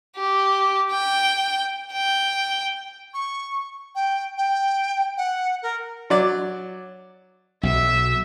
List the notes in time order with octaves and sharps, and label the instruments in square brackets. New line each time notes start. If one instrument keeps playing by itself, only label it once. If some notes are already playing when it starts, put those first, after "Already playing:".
[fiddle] G4
G5
G5
[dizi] C#6
G5
G5
F#5
A#4
[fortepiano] F#3 D5
[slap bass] B1 B2 [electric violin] E5 E6